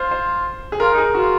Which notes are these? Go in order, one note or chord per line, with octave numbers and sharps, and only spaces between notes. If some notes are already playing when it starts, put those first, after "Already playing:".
Already playing: F4 C5
C5
G#4
F4 A#4
D#4
G#4
F4 F#4